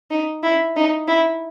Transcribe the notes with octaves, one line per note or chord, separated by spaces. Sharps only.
D#4
E4
D#4
E4